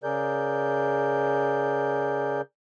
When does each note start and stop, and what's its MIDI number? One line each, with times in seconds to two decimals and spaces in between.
0.04 2.41 49
0.04 2.41 68
0.04 2.41 70
0.04 2.41 74
0.04 2.41 91